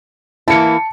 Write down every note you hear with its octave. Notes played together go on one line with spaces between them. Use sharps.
E3 A#3 E4 A5 C#7